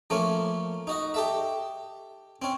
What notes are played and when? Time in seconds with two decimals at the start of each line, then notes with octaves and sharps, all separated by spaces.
0.10 F3 A3 A#3 C#4
0.87 D#4 F#4 D#5
1.14 G4 A4 E5
2.42 C4 C#4